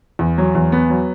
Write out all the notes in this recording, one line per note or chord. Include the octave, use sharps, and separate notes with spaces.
E2
F#3
E2
B3
F#3